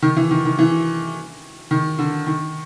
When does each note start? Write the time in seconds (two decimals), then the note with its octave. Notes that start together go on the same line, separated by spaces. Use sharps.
0.02 D#3
0.17 E3
0.31 D#3
0.45 D#3
0.59 E3
1.71 D#3
1.99 D3
2.27 D#3